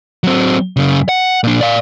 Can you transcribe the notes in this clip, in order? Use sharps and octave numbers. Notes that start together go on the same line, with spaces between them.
F#3 C4
F#2 C#3
F#5
A#2 D4
D5 F5